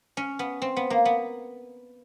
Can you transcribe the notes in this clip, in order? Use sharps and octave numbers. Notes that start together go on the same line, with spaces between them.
C#4
B3
C4
B3
A#3
B3